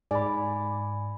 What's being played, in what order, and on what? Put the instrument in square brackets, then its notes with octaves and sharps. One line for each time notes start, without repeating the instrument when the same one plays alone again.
[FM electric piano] G#2 [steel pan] D5 [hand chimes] G#5 B5